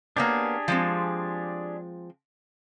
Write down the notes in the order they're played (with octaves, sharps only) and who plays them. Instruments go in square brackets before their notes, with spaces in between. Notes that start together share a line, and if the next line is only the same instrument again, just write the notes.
[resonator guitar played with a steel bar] A#3 B3 C#5 [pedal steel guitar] D4 G4 G#4
[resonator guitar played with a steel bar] F3 G#3 C4